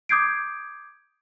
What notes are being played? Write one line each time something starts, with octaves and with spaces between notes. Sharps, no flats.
D6 D#6 G6 G#6 C7 D7